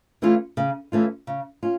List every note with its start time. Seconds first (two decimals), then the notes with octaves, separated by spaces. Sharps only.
0.22 E3 A3 C#4 F4
0.57 C#3
0.92 E3 A3 C#4 F4
1.27 C#3
1.63 C#4 F4